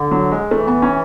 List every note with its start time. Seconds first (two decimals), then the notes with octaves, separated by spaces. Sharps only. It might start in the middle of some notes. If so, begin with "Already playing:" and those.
Already playing: D3
0.11 F#3
0.32 G#3
0.51 E3 A3
0.67 B3
0.82 C#4